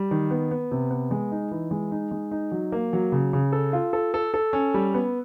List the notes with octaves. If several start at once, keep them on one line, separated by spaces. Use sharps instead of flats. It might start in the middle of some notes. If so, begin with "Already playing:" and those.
Already playing: G3
D#3
B3
B3
C3
B3
G#3
D#4
E3
G#3
D#4
G#3
D#4
F#3
A#3
F#3
C#3
C#3
A4
F4
A4
A4
A4
C#4
G3
B3